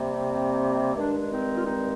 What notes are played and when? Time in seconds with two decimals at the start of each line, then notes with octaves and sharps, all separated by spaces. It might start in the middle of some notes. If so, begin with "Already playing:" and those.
Already playing: C3 G3 A#3
0.09 C4
0.95 G2 D#3 G#3 D4
1.19 D4
1.30 C4 D#4
1.54 F4
1.64 C4 D#4